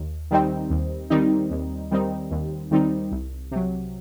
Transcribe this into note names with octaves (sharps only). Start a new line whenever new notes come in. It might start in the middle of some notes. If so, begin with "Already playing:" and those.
Already playing: D#2
D#3 G3 C4 D#4
D#2
D#3 G3 C4 D#4
D#2
D#3 G3 C4 D#4
D#2
D#3 G3 C4 D#4
C2
C3 F#3